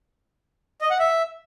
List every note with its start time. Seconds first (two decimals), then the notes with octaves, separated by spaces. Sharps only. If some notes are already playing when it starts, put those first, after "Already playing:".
0.81 D#5
0.90 F#5
1.00 E5